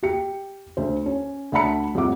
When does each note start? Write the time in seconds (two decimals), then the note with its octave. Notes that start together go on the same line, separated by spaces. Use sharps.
0.03 G4 G5 C#7
0.77 D2 C5
1.06 C#4
1.52 D2 E5 F#5 A5 B5 C#7
1.95 F2 A2 G3 C4 F#5 D6